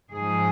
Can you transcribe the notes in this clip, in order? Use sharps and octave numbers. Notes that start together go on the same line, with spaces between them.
G#2 F3 G#4